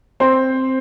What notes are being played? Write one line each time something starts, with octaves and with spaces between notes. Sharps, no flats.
C4 C5